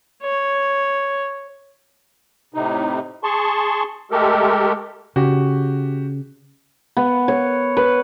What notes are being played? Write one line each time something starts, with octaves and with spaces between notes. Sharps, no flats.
C#5
A2 C3 D#4
G#4 A5 C6 C#6
G#3 A3 G4 A4 A#4
C#3 F#4 G4
B3
C#5
B4